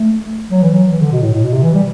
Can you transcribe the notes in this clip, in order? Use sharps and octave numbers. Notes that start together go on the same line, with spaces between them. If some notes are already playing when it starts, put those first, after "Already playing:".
Already playing: A3
F#3
E3
F#3
E3
D3
B2
A2
A2
B2
C3
E3
G3